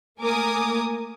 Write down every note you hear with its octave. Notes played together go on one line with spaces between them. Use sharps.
A3 A#3 A#4 G#5 D6 D#6